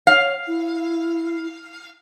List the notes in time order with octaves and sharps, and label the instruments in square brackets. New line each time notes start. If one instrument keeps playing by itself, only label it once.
[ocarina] C#5 [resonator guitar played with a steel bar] F5
[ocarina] E4